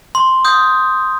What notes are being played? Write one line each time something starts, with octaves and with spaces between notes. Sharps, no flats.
C6
D#6 G6